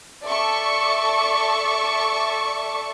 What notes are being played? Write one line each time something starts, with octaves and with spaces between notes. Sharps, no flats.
A4 D5 E5 C#6